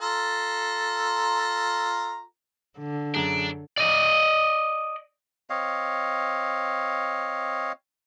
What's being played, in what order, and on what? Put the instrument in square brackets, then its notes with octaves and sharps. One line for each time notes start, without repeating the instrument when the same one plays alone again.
[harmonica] F4 A4 A#5
[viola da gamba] D3
[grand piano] F#2 G#4 A#5 [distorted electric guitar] D4
[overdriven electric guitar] D5 D#5
[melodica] C4 C#5 D#5 F5